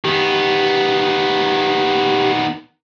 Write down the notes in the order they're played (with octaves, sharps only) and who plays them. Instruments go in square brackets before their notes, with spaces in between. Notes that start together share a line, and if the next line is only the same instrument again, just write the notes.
[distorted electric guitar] D#3 B3 [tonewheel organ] G4